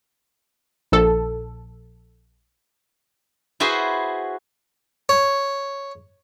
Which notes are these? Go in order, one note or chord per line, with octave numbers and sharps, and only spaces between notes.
A#1 A4
E4 F#4 G#4 B4 C5
C#5